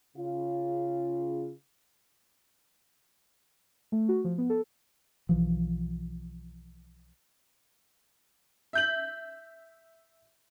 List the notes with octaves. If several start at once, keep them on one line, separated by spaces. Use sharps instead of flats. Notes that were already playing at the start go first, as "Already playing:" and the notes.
C#3 F4
A3
F#4
F3
B3
A4
B1 E3 F3
E5 G6 F#7